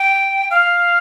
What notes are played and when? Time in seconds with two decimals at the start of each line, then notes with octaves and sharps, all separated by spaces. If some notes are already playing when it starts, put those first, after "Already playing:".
Already playing: G5
0.51 F5